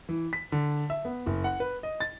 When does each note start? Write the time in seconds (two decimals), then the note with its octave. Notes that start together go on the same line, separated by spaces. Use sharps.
0.09 E3
0.33 B6
0.52 D3
0.90 E5
1.05 B3
1.26 F#1
1.44 F#5
1.60 B4
1.83 D#5
2.00 A6